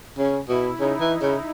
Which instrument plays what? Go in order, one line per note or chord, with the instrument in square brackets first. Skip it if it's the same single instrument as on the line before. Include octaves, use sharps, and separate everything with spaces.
[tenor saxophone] C#3 [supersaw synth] C#4
[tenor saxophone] B2 [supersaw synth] E4
[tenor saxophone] C#3 [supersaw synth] D#4
[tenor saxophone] E3
C#3